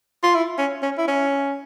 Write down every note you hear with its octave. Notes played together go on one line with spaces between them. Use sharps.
F4
E4
C#4
C#4
E4
C#4